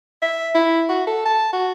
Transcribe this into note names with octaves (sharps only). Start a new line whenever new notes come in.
E5
E4
F#4
A4
A5
F#4